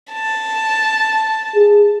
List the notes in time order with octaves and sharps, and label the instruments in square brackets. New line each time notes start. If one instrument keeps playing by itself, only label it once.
[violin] A5
[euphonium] G#4